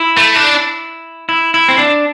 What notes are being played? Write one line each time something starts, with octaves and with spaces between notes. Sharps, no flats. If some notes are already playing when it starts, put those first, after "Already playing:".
Already playing: E4
A3
D4
E4
E4
C4
D4